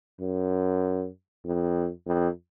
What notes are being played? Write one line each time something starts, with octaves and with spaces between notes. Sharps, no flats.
F#2
F2
F2